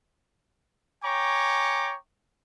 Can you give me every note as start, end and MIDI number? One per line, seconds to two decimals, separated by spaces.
1.04 1.95 73
1.04 1.95 79
1.04 1.95 80
1.04 1.95 82
1.04 1.95 85
1.04 1.95 86